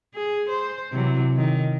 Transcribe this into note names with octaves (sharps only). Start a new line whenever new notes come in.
G#4
C5
C3 E3 F#3
D#3